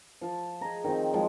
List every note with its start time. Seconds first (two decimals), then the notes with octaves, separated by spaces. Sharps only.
0.21 F3 A5
0.61 G#4 D#5 A#5
0.84 D#3 F3 C4
1.14 F3 F#3 G#3